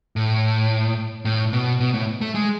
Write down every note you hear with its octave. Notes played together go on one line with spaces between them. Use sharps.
A2
A2
B2
B2
A2
A3
G#3